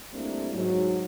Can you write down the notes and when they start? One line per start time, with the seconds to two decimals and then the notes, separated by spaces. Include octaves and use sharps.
0.12 G3 A3 A#3 C4 D4 E4
0.53 G#2 F#3